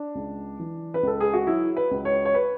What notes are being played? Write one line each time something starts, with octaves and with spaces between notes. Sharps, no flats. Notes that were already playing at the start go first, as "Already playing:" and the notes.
Already playing: D4
C#2
E3
B4
C#2 A4
G#4
F#4
F#3 E4
B4
C#2
C#5
C#5
B4